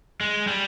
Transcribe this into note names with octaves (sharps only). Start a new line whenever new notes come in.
G#3
G3